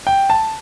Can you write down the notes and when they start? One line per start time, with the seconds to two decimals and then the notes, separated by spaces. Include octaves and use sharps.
0.07 G5
0.30 A5